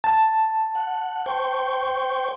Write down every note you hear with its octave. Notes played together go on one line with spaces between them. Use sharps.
A5
F#5
C5 G5 C#6